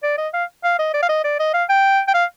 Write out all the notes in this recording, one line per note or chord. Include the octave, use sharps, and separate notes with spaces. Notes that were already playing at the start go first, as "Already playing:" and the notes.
D5
D#5
F5
F5
D#5
D5
F5
D#5
D5
D#5
F5
G5
G5
F5